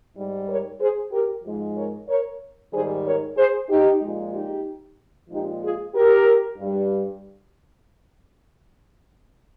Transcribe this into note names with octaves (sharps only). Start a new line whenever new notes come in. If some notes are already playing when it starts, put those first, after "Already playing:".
G#2 G3
A#4 C#5
G#4 C5
G4 A#4
G#2 F3 G#3
A#4 C#5
A#4 C#5
G#2 D#3 G3 G#4 C5
A#4 C#5
G#4 C5
D#4 G4
A#2 F3 G#3
D#4 G4
A#2 F3 G#3 D#4 G4
F4 G#4
G4 A#4
G2 G3